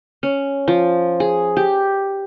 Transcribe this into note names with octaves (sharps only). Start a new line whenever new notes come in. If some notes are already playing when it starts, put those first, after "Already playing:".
C#4
F3
G#4
G4